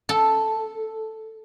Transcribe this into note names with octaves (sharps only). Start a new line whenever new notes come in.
A4